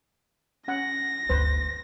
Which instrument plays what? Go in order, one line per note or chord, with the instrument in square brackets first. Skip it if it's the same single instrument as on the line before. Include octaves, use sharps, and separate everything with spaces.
[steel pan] C#4 F#5 [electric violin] A#6
[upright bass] G1 D2 [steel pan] B4 C5